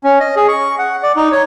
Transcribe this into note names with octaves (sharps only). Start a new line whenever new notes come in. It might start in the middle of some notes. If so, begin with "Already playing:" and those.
C#4
D#5
G#4
C#6
F#5
D5
D#4
C#5